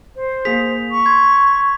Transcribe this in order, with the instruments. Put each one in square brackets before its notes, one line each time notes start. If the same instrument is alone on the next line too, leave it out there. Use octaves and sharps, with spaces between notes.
[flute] C5
[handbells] A#3 G#4 [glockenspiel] B6 F7
[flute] C#6
[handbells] C6 [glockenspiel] G#6